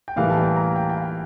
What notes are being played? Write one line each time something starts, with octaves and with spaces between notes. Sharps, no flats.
G5
A2 E3 G3 A#3 F5
A5
G5
A#5
G5
G5
F5